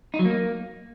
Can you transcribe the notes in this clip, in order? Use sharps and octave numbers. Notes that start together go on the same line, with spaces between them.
D#4
F#3
A#3